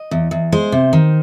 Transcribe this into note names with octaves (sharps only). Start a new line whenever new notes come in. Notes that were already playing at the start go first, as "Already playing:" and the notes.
Already playing: D#5
E2
E2
G#3 C5
C3
D#3